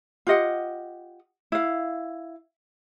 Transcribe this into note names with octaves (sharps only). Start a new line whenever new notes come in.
F4 G4 D#5 F#5
E4 F5